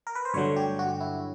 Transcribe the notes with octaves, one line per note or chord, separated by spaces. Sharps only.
A#4
B4
C5
G2 D3 F#3 A3 C#5
G4
F#4
E4